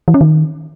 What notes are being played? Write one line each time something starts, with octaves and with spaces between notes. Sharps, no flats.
E3
C#4
D#3